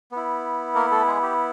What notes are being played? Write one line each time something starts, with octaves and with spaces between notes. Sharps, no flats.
B3 E4
A#3 A#4
A3 A4
G#3 G#4
G4